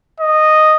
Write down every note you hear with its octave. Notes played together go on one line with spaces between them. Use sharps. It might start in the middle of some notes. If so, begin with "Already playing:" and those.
D#5